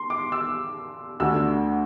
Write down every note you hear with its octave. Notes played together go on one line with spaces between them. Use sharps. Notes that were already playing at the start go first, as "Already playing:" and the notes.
Already playing: C6
D6
E6
D2 D3 E6